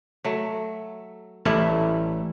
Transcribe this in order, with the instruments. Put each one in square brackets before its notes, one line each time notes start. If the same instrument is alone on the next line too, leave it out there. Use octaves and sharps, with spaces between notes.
[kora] F#3 A3
[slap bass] A1 [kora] G3 A3 E4